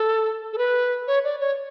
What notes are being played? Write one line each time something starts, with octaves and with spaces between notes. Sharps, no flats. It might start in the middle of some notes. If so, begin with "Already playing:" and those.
Already playing: A4
A4
B4
C#5
D5
C#5